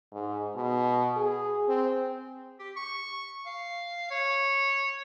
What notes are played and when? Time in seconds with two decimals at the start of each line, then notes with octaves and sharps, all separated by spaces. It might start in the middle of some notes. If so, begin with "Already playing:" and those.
0.13 G#2
0.55 B2
1.16 G#4
1.68 C4
2.60 G4
2.77 C#6
3.46 F5
4.11 C#5